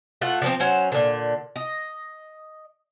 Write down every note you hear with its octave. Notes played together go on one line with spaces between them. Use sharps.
A3 F4 F#5
D3 F3 C4
F#3 C#4 C5 F#5
A#2 D3
D#5